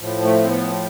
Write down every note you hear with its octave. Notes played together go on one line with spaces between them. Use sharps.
A2 F3
A3
C4
B3